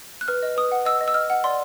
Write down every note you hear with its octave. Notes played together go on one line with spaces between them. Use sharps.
F#6
B4 F6
D#5
B4 D#6
F#5
D#5 E6
D#5
E6
D#5 F6
F#5
D5 C6